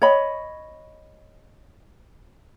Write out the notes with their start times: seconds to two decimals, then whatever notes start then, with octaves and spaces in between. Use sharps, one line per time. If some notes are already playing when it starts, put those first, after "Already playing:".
0.02 C#5 D#5 B5